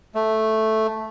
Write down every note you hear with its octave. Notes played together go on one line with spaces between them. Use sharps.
A3